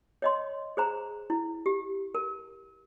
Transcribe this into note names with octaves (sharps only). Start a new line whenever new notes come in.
C#5 D#5 C6
G#4 C5 A#5
E4
G4
A#4